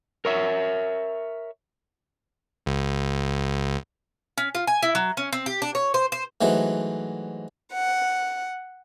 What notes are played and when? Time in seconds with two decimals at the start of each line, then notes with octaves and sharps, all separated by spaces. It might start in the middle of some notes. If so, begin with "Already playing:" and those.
0.25 A#4 C#5 E5
2.66 C#2
4.38 C#4
4.55 F4
4.67 G#5
4.82 E4
4.95 F#3
5.17 C#4
5.33 C4
5.46 G4
5.62 D4
5.75 C#5
5.94 C5
6.12 C5
6.41 G#2 E3 F#3 A3
7.73 F#5